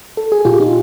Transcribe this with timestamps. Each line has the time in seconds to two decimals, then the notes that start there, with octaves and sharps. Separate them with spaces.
0.17 A4
0.32 G#4
0.45 A#2 F4 G4
0.60 D#4 F4